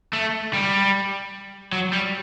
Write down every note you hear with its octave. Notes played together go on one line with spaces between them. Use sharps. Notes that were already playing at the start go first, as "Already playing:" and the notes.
A3
G3
F#3
G3